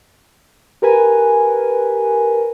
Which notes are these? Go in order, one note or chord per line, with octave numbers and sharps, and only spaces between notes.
G4 A#4 B4 G#5